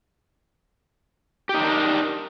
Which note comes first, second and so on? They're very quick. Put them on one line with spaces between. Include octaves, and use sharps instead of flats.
G4 D#4 D4 A#4